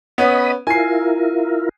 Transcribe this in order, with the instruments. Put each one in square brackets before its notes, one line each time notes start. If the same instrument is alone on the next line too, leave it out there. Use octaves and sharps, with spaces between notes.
[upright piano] B3 C#4 [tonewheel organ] D#5 B5 D#6
[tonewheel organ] E4 F4 A#4 [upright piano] G#5 C7